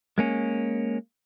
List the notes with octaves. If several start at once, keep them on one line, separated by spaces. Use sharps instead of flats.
G#3 A#3 C#4